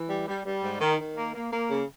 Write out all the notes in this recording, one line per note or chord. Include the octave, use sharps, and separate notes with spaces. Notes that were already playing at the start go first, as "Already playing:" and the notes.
Already playing: E3
G3
G3
G3
G#2
D#3
D#3
A#3
A#3
A#3
C#3